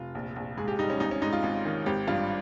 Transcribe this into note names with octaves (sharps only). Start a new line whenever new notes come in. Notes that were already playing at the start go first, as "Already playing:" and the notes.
Already playing: F1 F4
A#1
A#1
G#2 G#4
G4
G3 D#4
C#4
G#1 D#4
C#4
G#2 D#4
F4
G#1
D#3
G#1 G4
G2 F4